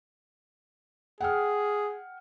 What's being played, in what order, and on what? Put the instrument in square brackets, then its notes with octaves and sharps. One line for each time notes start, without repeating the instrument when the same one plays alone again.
[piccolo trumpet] G#4 [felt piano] F#5 G5 F6